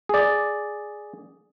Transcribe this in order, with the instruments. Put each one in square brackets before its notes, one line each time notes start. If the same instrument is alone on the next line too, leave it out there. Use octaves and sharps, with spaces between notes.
[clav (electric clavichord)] G#4 D5